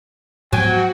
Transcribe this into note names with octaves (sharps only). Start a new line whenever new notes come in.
G#2 F3 F#3 B3 F#4 G5 G#5